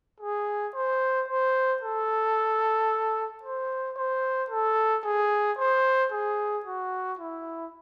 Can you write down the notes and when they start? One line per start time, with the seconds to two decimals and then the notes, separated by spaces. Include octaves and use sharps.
0.20 G#4
0.75 C5
1.28 C5
1.82 A4
3.43 C5
3.96 C5
4.50 A4
5.04 G#4
5.58 C5
6.12 G#4
6.65 F#4
7.19 E4